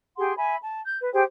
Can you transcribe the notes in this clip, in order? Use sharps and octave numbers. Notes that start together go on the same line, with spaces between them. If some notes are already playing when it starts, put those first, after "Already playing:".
G4 G#4 F#5 C6
E5 G#5 B5
A5
G6
B4
G4 G#4 C5 G5